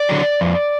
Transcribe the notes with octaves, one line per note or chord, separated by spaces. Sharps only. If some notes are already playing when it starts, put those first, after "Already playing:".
Already playing: D5
D3 F#3
F2